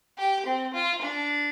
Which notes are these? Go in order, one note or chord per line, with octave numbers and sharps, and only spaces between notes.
G4
C4
F4
D4